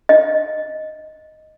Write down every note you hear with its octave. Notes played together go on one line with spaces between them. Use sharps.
D#5